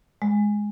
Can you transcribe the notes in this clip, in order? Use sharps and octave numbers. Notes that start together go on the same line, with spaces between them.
G#3